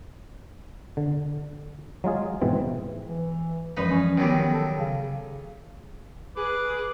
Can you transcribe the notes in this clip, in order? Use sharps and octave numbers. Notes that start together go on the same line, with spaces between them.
D3
F#3 G#3 F4 G#4
G#2 B2 E3 C4
E3
F#2 E3 F3 G#3 D#4 B4
C#4
D#3 F#3 G3 B3
A4
C#3
G#4 B4 D6